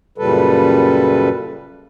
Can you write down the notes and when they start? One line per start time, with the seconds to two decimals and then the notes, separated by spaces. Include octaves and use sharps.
0.18 F#2 A#2 C#3 G3 A4 B4